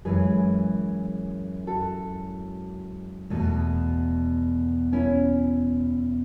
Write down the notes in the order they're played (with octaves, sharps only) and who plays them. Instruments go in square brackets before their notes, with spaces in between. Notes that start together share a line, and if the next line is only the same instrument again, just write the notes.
[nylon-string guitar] F#2 E3 G#3 G#4 B4
F#4 A4
E2 B2 A3
C#4 E4